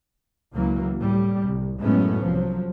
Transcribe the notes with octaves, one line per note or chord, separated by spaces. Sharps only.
C#2 E3 F#3 A#3
A2 G3
C2
F#2 A2 G#3 A3 B3 C#4
C2 F3 F#3